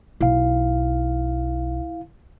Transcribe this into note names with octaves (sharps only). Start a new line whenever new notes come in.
B1 E4 F5